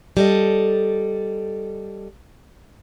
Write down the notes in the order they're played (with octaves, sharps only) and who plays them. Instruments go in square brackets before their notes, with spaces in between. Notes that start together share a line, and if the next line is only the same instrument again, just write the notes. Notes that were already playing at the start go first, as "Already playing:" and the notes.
[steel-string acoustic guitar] G3 A4 D#5